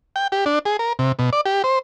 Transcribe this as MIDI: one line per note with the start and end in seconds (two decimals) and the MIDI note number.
0.16 0.27 79
0.32 0.45 67
0.46 0.59 62
0.65 0.77 68
0.79 0.93 70
0.99 1.12 48
1.19 1.30 47
1.33 1.41 74
1.46 1.62 67
1.64 1.79 72